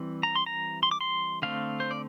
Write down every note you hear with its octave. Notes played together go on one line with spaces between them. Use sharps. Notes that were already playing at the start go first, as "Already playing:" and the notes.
Already playing: E3 G3 C4
A#5
C6
A#5
C6
D6
C6
D3 A3 C4 F5
C5
D5